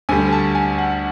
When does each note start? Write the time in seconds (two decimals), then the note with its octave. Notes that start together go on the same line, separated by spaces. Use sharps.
0.09 D2 D3 G3 G#5
0.32 A5
0.55 G#5
0.78 F#5